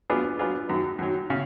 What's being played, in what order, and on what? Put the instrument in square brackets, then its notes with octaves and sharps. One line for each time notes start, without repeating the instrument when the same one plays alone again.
[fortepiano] F#3 B3 D4 F4 G#4
F#3 B3 D4 F4 G#4
F#2 D#3 F#3
F#2 D#3 F#3
C#3